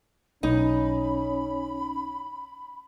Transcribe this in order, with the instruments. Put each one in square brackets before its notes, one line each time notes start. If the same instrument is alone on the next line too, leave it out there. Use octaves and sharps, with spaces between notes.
[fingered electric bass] B1 [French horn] C#4 [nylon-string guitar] D#4 [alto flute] B5